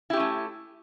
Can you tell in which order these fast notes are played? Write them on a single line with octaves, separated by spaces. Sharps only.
E4 G4 C#4 A3